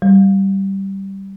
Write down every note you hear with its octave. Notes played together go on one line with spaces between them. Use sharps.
G3